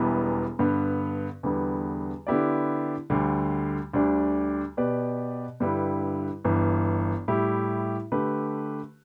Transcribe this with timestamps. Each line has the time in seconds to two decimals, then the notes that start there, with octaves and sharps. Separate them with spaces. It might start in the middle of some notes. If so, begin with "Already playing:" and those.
Already playing: E1 E2 E3 G3 B3
0.59 G2 D3 B3
1.43 E2 D3 G3 B3
2.27 D3 B3 E4 G4 D5
3.10 D2 D3 G3
3.93 D2 D3 G3 D4 G4
4.77 B2 B3 G4 B4 D5
5.60 G2 D3 G3 E4 B4
6.44 G1 G2 E3
7.28 A2 G3 E4 G4
8.12 D3 A3 G4 B4